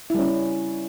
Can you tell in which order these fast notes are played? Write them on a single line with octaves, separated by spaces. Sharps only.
E4 G3 C#4